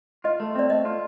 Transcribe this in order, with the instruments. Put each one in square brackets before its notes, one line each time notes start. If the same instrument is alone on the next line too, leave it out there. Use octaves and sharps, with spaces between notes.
[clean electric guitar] F4 [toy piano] D#5
[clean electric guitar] A3
[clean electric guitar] C4 [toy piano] D5
[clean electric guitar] A3 [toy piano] D#5
[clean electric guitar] F4